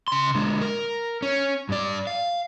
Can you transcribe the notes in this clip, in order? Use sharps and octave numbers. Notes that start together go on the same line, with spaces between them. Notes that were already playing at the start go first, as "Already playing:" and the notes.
C#3 C6
D3 G#3
A#4
C#4
G2 D5
F5